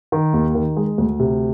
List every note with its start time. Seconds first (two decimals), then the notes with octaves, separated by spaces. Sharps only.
0.12 D#3
0.33 D#2
0.55 D#3
0.77 G#3
0.98 D2
1.19 C3